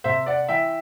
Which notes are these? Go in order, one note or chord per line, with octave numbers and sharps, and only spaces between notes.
C3 C5 E5
C4 D5 F#5
E3 E5 G5